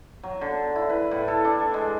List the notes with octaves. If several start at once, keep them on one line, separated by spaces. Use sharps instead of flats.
F#3
D3
E4
B4
A2
A4
D4
G#3